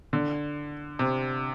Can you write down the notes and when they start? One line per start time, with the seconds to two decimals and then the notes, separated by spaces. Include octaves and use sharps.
0.13 D3
0.99 C3